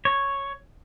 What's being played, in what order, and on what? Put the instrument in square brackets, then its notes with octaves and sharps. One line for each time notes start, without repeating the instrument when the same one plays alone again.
[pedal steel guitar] C#5